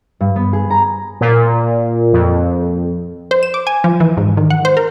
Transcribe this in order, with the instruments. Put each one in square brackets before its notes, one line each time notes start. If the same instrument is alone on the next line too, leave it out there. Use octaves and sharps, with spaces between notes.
[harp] G2
B3
G#4
A#5
[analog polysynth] A#2
F2
[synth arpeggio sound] C5
E7
D6
G#5
F3
E3
G#2
D#3
F#5
C5
A#4